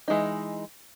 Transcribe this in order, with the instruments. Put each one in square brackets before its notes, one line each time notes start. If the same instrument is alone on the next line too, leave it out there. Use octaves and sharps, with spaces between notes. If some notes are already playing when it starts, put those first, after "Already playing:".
[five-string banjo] E3 G#3 D#4